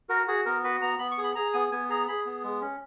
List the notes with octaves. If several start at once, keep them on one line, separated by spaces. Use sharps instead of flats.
F#4 A#4
F#4 G#4
B3 A#4
F#4 B4
B3 A#5
B3 B5
C#6
G#4
B5
G#4 A#5
B3 G#5
B3 G#5
G#4 A#5
G#4 B5
B3
G#3
C#4